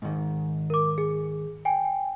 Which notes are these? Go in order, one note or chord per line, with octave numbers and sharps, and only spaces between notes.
G#2 D#3
A#4 D6
G#4
G5 G#5